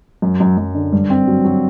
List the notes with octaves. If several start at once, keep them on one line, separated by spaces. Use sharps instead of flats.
F#2
F#2
F#2
D3
G2
C4
F#3
F#3